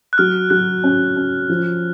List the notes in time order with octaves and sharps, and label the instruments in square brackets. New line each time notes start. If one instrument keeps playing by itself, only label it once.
[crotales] F#6
[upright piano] F#3 [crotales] F6
[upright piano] F#3 [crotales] F#6
[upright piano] C#4
C#4
F3